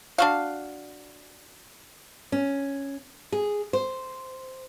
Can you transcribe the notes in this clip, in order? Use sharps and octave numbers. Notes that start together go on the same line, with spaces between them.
D4 F#4 F5
C#4
G#4
C5